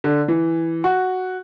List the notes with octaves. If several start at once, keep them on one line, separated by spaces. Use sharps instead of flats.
D3
E3
F#4